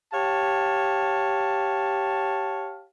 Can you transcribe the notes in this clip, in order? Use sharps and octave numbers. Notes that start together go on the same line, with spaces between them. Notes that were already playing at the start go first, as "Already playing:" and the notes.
G4 C#5 F5 A5